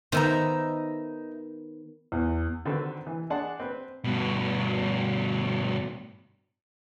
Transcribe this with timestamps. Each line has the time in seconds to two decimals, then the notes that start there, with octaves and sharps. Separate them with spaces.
0.12 D#3 B3 D#4 C5 E5 A#5
2.12 E2
2.65 D3 D#3 C4 F#4 A4 B4
3.07 E3
3.30 D4 G#4 D5 F#5 A5 C6
3.60 C4 B4
4.04 G2 B2